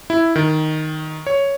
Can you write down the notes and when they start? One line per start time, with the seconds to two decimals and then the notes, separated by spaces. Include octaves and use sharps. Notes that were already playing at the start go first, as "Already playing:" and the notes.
0.10 E4
0.36 D#3
1.27 C#5